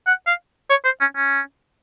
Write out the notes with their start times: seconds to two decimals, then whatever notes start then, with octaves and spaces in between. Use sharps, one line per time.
0.07 F#5
0.27 F5
0.70 C#5
0.85 C5
1.01 C#4
1.17 C#4